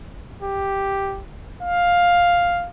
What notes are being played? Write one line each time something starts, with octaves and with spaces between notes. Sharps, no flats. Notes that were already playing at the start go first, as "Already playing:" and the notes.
G4
F5